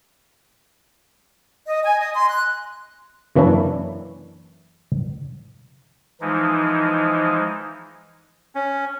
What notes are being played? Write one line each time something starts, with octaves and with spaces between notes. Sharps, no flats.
D#5
G#5
D#5
C6
F#6
F#2 E3 A#3 C#4 D4 E4
E3 F3 G#3 D#4
C#4